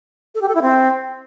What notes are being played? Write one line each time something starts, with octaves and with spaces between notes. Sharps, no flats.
A4
G4
A4
E4
C4